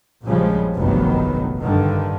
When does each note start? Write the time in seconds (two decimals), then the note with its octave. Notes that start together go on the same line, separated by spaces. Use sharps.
0.24 A#1 A#2 C#3 F3 G3 G#3
0.76 F1 A#1 G2 D#3 F#3 B3
1.60 G2 D3 D#3